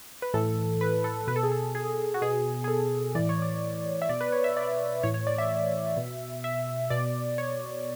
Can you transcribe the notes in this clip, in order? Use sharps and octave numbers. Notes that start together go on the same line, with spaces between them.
B4
A2 E3 A4
B4
A4
B2 B4
A4
G#4
A4
G#4
F#4
B2 G#4
G#4
A4
A2 E3 D5
C#5
D5
E5
B2 D5
B4
C#5
E5
D5
A2 E3 C#5
C#5
D5
E5
B2
E5
B2 D5
C#5